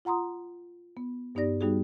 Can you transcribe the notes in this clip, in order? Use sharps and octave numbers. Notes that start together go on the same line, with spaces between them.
F4 F#5 A#5 C6 D#6
B3
G2 B3 D#4 G4 D5 A#6
G3 B3 D#4 F#4 G#4